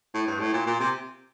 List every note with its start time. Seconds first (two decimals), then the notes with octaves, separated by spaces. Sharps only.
0.14 A2
0.27 G2
0.39 A2
0.53 A#2
0.66 A#2
0.79 C3